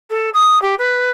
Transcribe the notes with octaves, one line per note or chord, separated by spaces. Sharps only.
A4
D#6
G4
B4